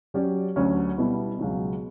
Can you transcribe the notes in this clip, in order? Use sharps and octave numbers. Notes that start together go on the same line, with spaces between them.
F#3 C#4 G4 D5
D2 D3 F#3 C#4
B2 G3 B3 E4
C#2 B2 F#3